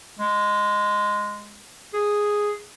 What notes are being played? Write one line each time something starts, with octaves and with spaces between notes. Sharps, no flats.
G#3
G#4